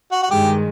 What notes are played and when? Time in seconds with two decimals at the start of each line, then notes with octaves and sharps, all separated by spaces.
0.11 F#4
0.23 F#4
0.31 G2 D#3 G#3 G4